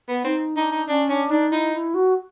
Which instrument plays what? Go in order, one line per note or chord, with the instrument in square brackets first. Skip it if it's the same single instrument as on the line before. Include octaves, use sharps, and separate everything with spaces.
[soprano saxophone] B3
[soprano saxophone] C4 [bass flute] D#4
[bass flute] D4 [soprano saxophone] D#4
[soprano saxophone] D#4
[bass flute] C#4 [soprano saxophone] D4
[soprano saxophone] C#4 [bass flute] D4
[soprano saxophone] D4 [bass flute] D#4
[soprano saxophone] D#4 [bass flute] E4
[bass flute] E4
F#4